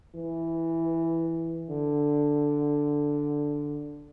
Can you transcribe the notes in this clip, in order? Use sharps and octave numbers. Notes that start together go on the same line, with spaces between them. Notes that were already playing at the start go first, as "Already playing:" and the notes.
E3
D3